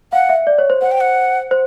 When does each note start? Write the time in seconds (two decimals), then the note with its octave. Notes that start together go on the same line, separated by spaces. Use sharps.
0.13 F5 F#5
0.29 E5
0.47 D5
0.58 C#5
0.70 C5
0.82 C5 F#5
0.92 G5
1.01 F#5
1.51 C5